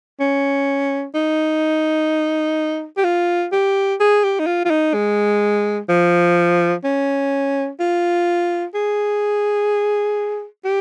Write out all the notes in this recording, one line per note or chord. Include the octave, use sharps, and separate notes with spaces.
C#4
D#4
G4
F4
G4
G#4
G4
D#4
F4
F4
D#4
G#3
F3
C#4
F4
G#4
G4